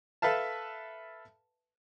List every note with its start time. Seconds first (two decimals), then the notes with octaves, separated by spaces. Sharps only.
0.22 A4 B4 E5 F5 A5